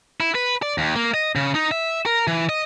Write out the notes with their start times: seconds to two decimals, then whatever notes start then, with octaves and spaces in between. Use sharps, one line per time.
0.20 E4
0.35 B4
0.62 D5
0.78 D#2
0.96 A#3
1.14 D#5
1.36 C#3
1.55 D#4
1.71 E5
2.06 A#4
2.27 E3
2.49 D#5